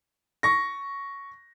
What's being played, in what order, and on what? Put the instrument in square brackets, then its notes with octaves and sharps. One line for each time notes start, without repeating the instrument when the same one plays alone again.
[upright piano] C#6 A#6